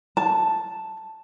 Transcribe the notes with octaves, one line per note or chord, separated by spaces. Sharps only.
A5